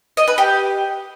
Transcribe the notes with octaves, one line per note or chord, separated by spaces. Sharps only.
D#5
B4
G4